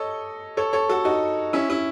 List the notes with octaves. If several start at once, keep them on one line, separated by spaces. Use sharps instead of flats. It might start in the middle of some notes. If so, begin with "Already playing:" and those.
Already playing: A4 C#5 D#5
A4 C#5
A4 C#5
F#4 A4
D#4 F#4
C#4 E4
C#4 E4